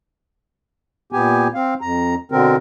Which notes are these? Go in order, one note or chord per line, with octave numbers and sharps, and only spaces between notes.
A#2 B3 G4 G#5
C4 F5
F2 A#5
B2 D3 C4 A#4